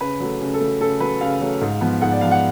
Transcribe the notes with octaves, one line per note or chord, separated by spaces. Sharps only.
C#3 B4
F#3 A3
C#3
A4
F#3 A3
C#3 A4
F#3 A3 B4
C#3 F5
F#3 A3
G#2
F3 B3
G#2 F#5
D5
F3 B3 F5
F#5